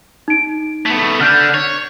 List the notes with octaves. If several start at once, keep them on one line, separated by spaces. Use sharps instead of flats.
D#4 D7
A3 B3
D3 D4 F6 G6 B6
C#5